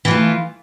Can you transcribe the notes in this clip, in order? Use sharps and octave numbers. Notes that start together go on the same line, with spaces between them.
E3 A3 F4